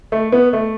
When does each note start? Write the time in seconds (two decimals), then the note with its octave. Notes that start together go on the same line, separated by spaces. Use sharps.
0.12 A3
0.32 B3
0.53 A3